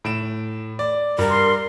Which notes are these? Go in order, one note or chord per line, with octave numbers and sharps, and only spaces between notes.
A2 D7 E7
D5
G2 A#4
C6